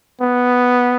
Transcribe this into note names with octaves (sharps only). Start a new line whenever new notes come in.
B3